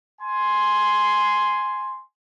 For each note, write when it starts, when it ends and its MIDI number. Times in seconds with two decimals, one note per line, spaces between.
0.21 2.01 80
0.21 2.01 84